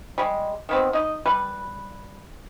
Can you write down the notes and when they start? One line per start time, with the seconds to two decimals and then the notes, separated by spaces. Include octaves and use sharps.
0.18 G3 G#3
0.69 D#3 B3 C4
0.93 D#4 D#5
1.26 G3 B4